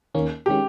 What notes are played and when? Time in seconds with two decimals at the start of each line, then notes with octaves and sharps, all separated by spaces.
0.15 D#2 D#3 A#3 C#4
0.46 D#3 G#3 C#4 G4